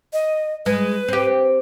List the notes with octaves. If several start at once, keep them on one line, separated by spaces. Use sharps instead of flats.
D#5
G#3 B4
C4 G4